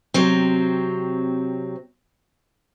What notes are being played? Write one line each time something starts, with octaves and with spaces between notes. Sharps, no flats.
C3 F#3 C4